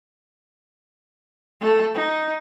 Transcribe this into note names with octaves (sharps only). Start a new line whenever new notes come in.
A3 A4
D#4